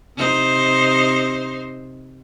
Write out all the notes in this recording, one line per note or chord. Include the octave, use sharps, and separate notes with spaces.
C3 D#4 C5